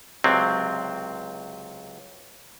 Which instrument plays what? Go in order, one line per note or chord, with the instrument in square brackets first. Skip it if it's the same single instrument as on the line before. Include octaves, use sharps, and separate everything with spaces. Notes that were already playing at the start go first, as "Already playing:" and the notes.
[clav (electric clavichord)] C#2 C3 F#3 C4